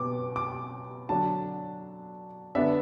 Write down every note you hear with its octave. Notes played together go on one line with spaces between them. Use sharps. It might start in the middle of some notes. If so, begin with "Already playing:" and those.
Already playing: B2 B3 D6
D6
D3 F#3 D4 A5
D3 B3 D4 E5